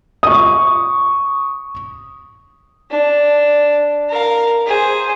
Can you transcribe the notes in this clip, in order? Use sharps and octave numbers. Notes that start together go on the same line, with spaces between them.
C#6 D#6
D4
A#4 F5
G#4 C5